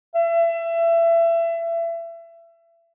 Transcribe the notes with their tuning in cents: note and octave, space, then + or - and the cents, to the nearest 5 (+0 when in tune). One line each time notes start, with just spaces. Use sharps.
E5 +30